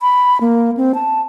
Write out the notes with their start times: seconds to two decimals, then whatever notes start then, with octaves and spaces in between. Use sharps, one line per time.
0.01 B5
0.41 A#3
0.77 C4
0.95 A5